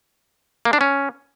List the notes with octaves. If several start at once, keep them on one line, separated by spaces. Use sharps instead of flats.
A#3
D4
C#4